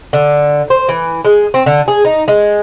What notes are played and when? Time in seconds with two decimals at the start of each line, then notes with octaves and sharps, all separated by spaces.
0.13 D3
0.70 C5
0.89 E3
1.25 G#3
1.54 C4
1.66 D3
1.88 G#4
2.05 D#4
2.28 G#3